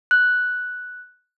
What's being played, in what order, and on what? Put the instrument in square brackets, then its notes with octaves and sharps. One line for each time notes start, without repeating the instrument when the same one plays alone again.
[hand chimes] F#6